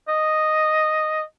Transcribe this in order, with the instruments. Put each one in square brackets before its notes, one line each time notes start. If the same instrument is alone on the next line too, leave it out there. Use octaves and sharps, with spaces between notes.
[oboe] D#5